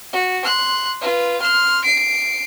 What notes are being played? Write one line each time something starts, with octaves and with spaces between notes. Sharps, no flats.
F#4
C6 F#6
F4 B4
C6 F6
C7 D7